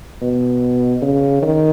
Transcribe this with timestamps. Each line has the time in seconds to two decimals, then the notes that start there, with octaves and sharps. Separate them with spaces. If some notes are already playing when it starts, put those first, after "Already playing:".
0.21 B2
1.02 C#3
1.42 D#3